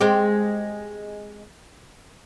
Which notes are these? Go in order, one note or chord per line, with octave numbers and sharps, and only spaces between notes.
G#3 C4 G4